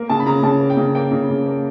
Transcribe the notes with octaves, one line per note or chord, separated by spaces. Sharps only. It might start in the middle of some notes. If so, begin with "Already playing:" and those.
Already playing: A#3
C#3 A5
B5
C#3 A#5
C#3 A5
A#3
G5
C#3
A#3 G5
C#3
C#3
A#3